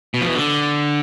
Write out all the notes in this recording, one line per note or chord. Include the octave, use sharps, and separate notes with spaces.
B2
F3
E3
D3